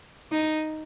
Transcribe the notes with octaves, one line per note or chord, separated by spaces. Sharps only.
D#4